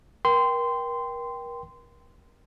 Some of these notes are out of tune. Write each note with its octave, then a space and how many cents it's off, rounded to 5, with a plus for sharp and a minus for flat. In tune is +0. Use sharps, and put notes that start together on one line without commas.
A#4 +35 G5 +0 C6 -20